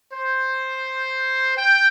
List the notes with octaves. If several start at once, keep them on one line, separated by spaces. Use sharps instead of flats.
C5
G5